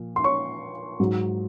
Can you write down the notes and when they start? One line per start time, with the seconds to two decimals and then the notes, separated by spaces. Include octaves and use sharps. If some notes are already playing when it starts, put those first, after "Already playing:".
Already playing: A#2 F3
0.16 C6
0.24 C#5 C#6
1.00 G#2 F#3